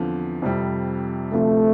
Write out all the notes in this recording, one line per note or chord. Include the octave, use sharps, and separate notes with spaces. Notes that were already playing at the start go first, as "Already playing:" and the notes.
Already playing: E2 D3 F3 C4
F2 C3 G3
D2 C3 F3 A3 C4